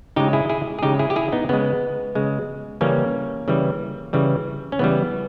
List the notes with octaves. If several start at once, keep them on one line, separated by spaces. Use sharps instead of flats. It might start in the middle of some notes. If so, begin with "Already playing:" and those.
C#3 G#3 D#4 G4
E4 G#4
E4 G#4
G#4
C#3 G#3 D#4 G4
E4 G#4
G4
E4 G#4
B3 D#4
C#3 G#3 B3
C#3 G#3
C#3 E3 G3 A#3 C#4
C#3 E3 G3
C#3 E3 G3
C#4
C#3 E3 G3 B3